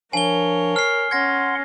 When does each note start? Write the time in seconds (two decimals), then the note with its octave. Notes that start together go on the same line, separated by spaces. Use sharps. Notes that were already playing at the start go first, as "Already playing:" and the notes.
0.13 F3 D4 A#4 C#5 F5 G#5 G7
0.76 F6 C7
1.11 C#4 F#5 C6 G#6 A#6